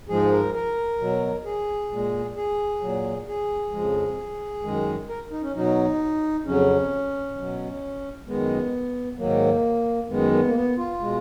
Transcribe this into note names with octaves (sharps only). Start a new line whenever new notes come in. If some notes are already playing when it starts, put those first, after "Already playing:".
G#2 F3 G#3 G#4
A#4
A#4
B2 F#3
G#4
A#2 G#3
G#4
A#2 F#3
G#4
F2 C#3 F3 G#3
F#2 D#3 G#3
A#4
D#4
C#4
B2 F#3 D#4
F2 C#3 F#3 C#4
B2 F#3
F#2 D#3 G#3 B3
G#2 D#3 F#3 A#3
F#2 D#3 G#3 B3
B3
A#3
B3
F4
B2 G#3